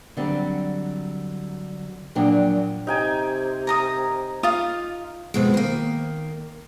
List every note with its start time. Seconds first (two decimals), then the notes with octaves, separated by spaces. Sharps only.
0.17 D3 F#3 G3 C4
2.15 A#2 F3 F#3 D4 G5
2.87 C3 D#4 G5 G#5
3.67 A#4 A#5 D#6
4.43 F4 F5 D#6
5.34 F2 B2 G#3
5.54 D#3 A#3